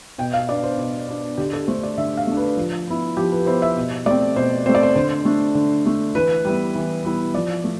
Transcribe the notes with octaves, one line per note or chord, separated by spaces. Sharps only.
B2 G5
F5
B3 D4 D5
C5
B2
B3 D4
D3 G4
A4
A3 D4 C5
D5
D3 E5
F5
A3 D4
B4
F3
B3 E4
F3 G4
B4
B3 E4 C5
E5
B2
A3 C4 D5
B2 C5
A3 C4 C5
D5
C5
D3 C5
A3 D4
D3
A3 D4
E3 B4
G3 B3 E4
E3
G3 B3 E4
F3 D5
A3